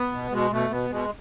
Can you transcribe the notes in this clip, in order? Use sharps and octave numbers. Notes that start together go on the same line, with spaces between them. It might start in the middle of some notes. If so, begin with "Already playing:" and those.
Already playing: B3
B2
B2 G#3
B2 A3
B2 B3
B2 G#3